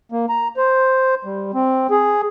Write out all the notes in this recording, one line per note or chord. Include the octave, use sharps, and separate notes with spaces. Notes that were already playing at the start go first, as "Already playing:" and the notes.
A#3
A#5
C5
G3
C4
G#4